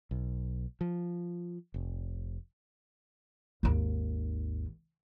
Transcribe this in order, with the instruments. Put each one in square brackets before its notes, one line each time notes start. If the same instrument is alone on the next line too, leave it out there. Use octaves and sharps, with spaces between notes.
[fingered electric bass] B1
F3
F1
[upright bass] G#1 D#2